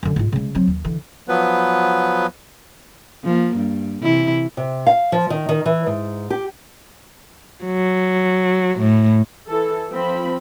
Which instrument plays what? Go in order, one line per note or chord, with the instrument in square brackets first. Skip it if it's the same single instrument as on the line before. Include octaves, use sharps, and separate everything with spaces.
[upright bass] F#2 D3
G#2 F4
C#3 G#3
F#3 C4
D#2
D3 E3
[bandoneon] F3 F#3 B3 B4
[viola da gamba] F3 A#3
G2
C3 E3 E4
[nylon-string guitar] C3
F5
F3
D#3
D#3
E3
G#2
G4
[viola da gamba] F#3
A2
[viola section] E3 A4
F3 C4 B5